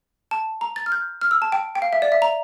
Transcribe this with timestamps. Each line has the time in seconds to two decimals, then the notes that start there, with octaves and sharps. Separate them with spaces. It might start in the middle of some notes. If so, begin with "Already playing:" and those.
0.31 A5
0.61 A#5
0.76 A6
0.86 F6
0.92 G6
1.21 F6
1.31 E6
1.42 A5
1.52 G5
1.75 G5
1.82 F5
1.93 E5
2.02 D5
2.12 E5
2.22 A#5